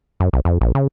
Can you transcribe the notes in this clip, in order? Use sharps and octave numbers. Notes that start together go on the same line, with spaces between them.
F#2
C2
F2
A#1
C#3